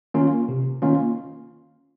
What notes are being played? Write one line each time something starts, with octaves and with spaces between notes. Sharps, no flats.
D#3 A#3 C#4 F4
C3
D#3 A#3 C#4 F4